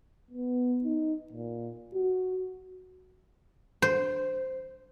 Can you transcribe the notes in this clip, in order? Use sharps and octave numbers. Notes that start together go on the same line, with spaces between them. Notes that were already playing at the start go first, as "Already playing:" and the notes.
B3
D#4
A#2
F#4
C5